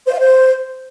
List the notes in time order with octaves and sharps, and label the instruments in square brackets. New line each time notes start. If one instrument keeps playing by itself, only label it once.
[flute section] C5
F5
C5